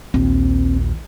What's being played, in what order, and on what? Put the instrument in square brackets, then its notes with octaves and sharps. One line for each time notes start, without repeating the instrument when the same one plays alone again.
[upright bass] A#1 D#2 [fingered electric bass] C4